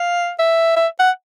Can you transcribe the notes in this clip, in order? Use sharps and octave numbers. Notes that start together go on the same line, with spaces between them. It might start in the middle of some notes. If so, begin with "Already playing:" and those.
Already playing: F5
E5
E5
F#5